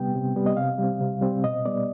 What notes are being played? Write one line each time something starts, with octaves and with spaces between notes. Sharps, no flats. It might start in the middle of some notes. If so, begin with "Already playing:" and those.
Already playing: C3 G3 B3 G5
C3
G3 B3
D#5
C3 F5
G3 C4
C3
G3 C4
B2 D#5
G3 B3 D5